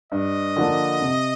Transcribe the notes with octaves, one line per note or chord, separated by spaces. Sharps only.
G2 D#5
D3 F3 A#3 D4
C3